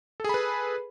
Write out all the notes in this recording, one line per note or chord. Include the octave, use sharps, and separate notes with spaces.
G#4 A4 B4 B5